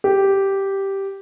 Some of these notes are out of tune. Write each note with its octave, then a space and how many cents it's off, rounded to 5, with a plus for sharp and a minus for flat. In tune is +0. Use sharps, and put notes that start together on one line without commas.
G4 -5